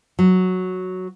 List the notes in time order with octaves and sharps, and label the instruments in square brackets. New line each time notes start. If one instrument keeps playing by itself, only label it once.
[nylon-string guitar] F#3